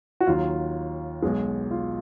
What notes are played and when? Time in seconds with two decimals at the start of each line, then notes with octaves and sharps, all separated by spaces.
0.21 F#4
0.27 D#2 D#3 F#3 F4
1.22 B1 B2 G#3
1.71 F4